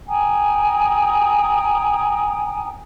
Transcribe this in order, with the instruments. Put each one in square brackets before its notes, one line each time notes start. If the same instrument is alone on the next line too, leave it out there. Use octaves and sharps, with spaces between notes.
[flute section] G5 G#5 A#5 D#6